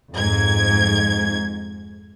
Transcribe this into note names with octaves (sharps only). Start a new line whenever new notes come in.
F2 G#2 G#6